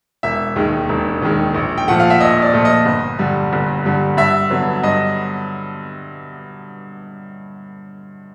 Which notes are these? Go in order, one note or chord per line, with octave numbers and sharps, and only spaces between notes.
E1 E5
D#2 D#3 G#3
E1
D#2 D#3 G#3
A#1
G5
A#2 F3 A3 F#5
F5
E5
A#1 D#5
D5
A#2 F3 A3
D#5
G1
G2 D3 G3
G1
G2 D3 G3
G2 E5
D3 F#3 B3
G2 D#5